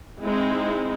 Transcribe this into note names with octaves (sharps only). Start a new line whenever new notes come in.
G#3 C4 D#4 E4